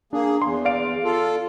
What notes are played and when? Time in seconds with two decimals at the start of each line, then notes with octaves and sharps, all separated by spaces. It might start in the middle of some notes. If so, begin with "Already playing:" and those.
0.13 A#3 D4 G#4
0.42 E2 C6
0.65 D5 F5 D7
1.04 F4 A4